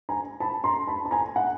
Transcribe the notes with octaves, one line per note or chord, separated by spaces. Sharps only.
G#5 A#5
A5 B5
A#5 C6
A5 B5
A5
G#5 A#5
F#5 G#5